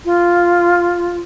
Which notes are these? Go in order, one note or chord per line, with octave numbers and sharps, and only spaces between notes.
F4